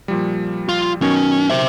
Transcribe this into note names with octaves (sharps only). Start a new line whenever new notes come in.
A#2 F3 G3
F4
B2 D#3 F#3 C#4
C5 E5